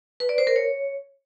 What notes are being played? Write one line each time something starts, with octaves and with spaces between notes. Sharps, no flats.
B4
D5
C5
A#4
C#5